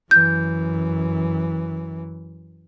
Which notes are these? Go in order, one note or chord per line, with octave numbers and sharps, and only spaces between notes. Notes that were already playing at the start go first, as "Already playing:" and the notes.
F#2 E3 G6